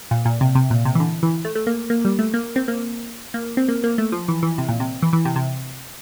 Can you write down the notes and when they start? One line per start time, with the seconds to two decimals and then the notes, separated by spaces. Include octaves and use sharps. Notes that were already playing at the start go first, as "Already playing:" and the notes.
0.11 A#2
0.25 A#2
0.41 C3
0.55 C3
0.70 A#2
0.85 C3
0.95 E3
1.00 D3
1.23 E3
1.45 A3
1.55 A3
1.67 A#3
1.90 A#3
2.05 G3
2.19 A3
2.34 A#3
2.56 C4
2.68 A#3
3.34 A#3
3.57 C4
3.68 A#3
3.84 A#3
3.98 A3
4.12 F3
4.28 E3
4.43 E3
4.58 C3
4.69 A#2
4.80 C3
5.02 E3
5.13 E3
5.25 C3
5.36 C3